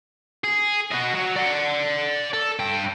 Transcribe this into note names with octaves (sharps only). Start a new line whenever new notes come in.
G#4
F#4 D#5
F#3
D5 F#5
A4
G2 G5